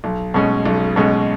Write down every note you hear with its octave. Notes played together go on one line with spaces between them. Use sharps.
B1
B2 G#3 C#4
B1
B2 G#3 C#4